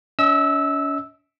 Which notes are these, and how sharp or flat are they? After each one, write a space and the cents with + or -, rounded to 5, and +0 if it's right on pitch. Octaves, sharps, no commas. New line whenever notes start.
C#4 +35 D#5 +45 E6 -10